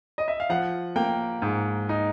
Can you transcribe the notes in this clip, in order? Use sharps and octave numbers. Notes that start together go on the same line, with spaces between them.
D#5
E5
F5
F3 F#5
A#3 G5
G#2
D#4